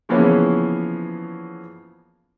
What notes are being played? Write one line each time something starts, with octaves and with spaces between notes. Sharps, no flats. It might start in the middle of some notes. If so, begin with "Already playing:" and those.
C#3 E3 F3 A#3 B3 C#4